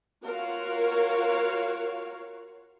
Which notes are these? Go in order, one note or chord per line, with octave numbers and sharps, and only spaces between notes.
F4 F#4 A#4 C#5 F5